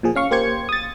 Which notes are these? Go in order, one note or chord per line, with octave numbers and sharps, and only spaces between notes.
A#2 F3 G#4
C#4 F5 C#6
A#3 G4 C5 G#6 C#7
D#6 A6